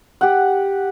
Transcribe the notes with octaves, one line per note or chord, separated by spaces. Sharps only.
G4 F#5